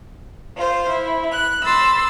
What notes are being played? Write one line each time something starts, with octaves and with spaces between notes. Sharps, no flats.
F4 C5
E4
F#6
B5 C6 E6 A6